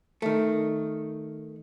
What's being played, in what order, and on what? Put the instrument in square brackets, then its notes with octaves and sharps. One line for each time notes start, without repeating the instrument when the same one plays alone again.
[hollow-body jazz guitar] D#3 A3